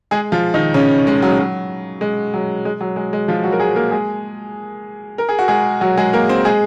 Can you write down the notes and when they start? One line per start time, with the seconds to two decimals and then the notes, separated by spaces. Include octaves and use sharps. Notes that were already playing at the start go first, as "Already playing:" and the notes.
0.11 G#3 G#4
0.32 F3 F4
0.54 D#3 D#4
0.74 C#3 C#4
1.07 G#3
1.22 F#3
1.31 G#3
1.39 F#3
2.01 G#3
2.34 F#3
2.65 G#3
2.81 F#3
2.96 G#3
3.13 G#3
3.28 F3 F4
3.44 F#3 F#4
3.52 A#4
3.59 G#3 G#4
3.76 A#3 A#4
3.91 G#3 G#4
5.18 A#4
5.29 G#4
5.39 F#4
5.48 G#3 G#4
5.81 F#3 F#4
5.97 G#3 G#4
6.13 A#3 A#4
6.29 C4 C5
6.45 G#3 G#4